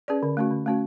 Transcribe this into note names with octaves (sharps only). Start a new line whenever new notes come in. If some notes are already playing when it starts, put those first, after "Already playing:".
C#4 G#4 B4 D5
D3
A3 C#4 F#4
D3
A3 C#4 F#4